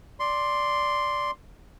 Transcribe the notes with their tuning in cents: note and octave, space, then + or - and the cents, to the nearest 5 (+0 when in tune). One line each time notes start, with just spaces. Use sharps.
D5 +0 C6 +0